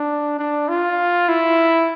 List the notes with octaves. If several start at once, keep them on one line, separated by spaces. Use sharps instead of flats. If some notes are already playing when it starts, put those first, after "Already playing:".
Already playing: D4
D4
F4
E4